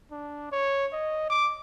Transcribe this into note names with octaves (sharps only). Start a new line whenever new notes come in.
D4
C#5
D#5
D6